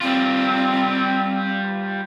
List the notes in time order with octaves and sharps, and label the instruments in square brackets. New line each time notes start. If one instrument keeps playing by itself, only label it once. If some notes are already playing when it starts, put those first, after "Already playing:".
[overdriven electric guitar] G3 F4 [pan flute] C4